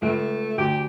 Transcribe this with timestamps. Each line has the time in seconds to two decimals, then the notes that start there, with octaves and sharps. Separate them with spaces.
0.02 C#2 A3
0.58 D2 G4